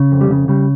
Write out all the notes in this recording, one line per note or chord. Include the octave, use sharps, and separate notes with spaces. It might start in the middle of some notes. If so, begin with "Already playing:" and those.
Already playing: C#3
F2
G3
C#3
C#3 G3